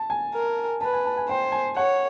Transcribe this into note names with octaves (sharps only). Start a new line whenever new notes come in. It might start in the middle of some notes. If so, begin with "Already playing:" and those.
Already playing: A5
G#5
A#4
B4 A5
G#5
A5
G#5
C5 G5
G#5
C#5 F#5